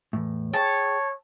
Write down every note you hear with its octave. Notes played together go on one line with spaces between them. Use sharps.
E2 A2
G#4 C#5 G5 A5